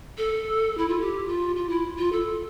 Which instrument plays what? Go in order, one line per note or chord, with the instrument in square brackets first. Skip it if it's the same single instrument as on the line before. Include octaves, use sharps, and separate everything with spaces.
[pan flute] A4
E4
F4
G4
F4
F4
E4
F4
A4